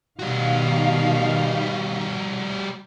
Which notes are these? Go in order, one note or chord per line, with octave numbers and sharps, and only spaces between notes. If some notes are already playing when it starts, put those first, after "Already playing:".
B2 D#3 G3 F#4 F5